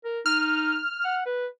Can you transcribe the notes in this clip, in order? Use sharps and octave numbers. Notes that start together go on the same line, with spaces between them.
A#4
D#4 F6
F#5
B4